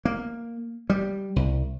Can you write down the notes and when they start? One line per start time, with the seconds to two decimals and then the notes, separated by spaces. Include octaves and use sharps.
0.05 A#3
0.90 G3
1.36 C2